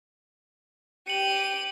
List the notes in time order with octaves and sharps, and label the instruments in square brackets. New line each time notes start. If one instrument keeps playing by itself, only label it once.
[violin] G4 D#7 [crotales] C#7 F#7